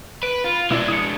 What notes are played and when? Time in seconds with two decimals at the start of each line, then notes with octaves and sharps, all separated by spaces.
0.23 B4 D7
0.44 F4
0.71 B2 G#3 D4 E4
0.88 D#6 C#7